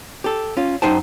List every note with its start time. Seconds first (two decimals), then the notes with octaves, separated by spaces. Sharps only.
0.24 G4 A4
0.57 C#4 F4
0.82 F#2 D#4 C5 G5 A5